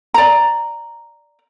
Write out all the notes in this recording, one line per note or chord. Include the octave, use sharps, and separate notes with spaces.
D5 A#5